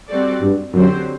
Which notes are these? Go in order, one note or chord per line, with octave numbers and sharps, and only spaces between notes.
G3 C4 F#4 A4 D5
G2
F#2 D3 F#3 C4 G4 C5